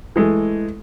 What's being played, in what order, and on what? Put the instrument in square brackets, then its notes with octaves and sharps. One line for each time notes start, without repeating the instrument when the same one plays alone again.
[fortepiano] E3 G#3 A3